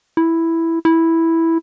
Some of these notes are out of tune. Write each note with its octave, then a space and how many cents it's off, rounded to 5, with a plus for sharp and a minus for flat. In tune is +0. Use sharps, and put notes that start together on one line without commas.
E4 +0
E4 -5